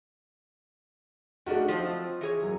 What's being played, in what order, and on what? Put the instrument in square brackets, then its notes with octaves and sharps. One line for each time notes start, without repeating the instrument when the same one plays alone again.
[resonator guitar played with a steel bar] G2 G3 D4 [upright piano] A3 D#4 F#4
[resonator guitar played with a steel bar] F3 F#3 C4 [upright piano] D#5
[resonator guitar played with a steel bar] E3 G#4 C#5
[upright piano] F#2 F#3